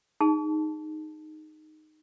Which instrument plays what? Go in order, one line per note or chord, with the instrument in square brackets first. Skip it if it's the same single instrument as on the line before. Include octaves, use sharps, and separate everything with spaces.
[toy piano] D#4 G#4 A5